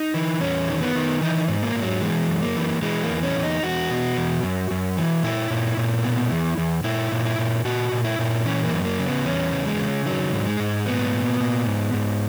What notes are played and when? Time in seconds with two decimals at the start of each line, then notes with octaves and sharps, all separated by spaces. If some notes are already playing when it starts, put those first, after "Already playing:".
Already playing: D#4
0.14 E3
0.41 E2 C#4
0.69 D#3
0.81 B3
0.95 D#3
1.21 E3 D#4
1.48 G#2
1.63 A#3
1.75 G#2
1.82 F#3
2.02 E3 G#3
2.28 F#2
2.42 A#3
2.56 E3
2.82 E3 G#3
3.03 A#3
3.10 E2
3.23 C#4
3.36 E2
3.43 D#4
3.63 E2 F#4
3.90 B2
4.17 E2
4.43 F#2
4.71 F#2
4.97 E3
5.23 A#2 E4
5.50 A#2
5.77 A#2
6.04 B2
6.31 E2
6.58 E2
6.84 A#2 E4
7.12 A#2
7.25 E4
7.38 A#2
7.65 A#2 F#4
7.92 A#2
8.04 E4
8.19 A#2
8.46 E3 C#4
8.65 A#3
8.73 F#2
8.85 A#3
8.99 C#3
9.06 B3
9.25 E2 C#4
9.52 C#3
9.66 G#3
9.79 C#3
10.06 D#3 F#3
10.33 G#2
10.47 G#3
10.60 G#2
10.86 A#2 B3
11.13 A#2
11.40 A#2
11.66 G#2
11.93 G#2